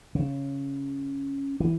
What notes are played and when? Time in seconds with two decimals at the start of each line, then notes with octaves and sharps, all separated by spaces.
0.15 C#3
1.60 E3